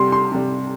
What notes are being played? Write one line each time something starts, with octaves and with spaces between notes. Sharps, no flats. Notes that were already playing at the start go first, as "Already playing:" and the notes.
Already playing: C3 G3 C6
C6
C3 G3